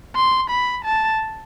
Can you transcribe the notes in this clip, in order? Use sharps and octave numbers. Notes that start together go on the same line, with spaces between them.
C6
B5
A5